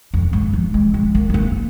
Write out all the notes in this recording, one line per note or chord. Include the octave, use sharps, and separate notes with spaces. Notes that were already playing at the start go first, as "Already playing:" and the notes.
F2
G#2
F3
G#3
G#3
A#3
G#3
A#3